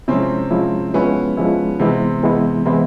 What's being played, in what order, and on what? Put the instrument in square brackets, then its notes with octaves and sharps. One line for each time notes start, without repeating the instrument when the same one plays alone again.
[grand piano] C3 C4 [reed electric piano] F3 G#3 C#4 E4
[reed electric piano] F3 G#3 C#4 E4
[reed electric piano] F3 G#3 C#4 E4 [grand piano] B3
[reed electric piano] F3 G#3 C#4 E4
[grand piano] C3 C4 [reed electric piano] E3 G#3 B3 E4
[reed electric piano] E3 G#3 B3 E4
[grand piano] C3 C4 [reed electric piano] E3 G#3 B3 E4